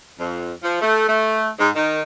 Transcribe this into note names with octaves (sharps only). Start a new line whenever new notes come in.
F2
F3
A3
A3
G#2
D#3